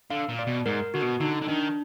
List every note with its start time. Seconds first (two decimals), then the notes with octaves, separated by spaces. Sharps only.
0.10 D3 F5
0.29 A#2
0.39 D5
0.47 B2
0.66 G#2 A#4
0.94 D3 F#4
1.02 B2
1.20 D3 D#4
1.42 D3
1.48 D#3 D4